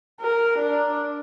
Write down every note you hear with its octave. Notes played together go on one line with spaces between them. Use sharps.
A#4
D4